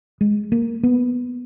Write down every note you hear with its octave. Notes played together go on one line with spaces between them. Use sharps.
G#3
A#3
B3